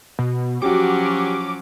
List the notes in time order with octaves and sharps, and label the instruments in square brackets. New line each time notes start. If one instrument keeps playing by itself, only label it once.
[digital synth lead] B2
[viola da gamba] F3 F#3 C#4 [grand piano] F#4 G4 [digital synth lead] D6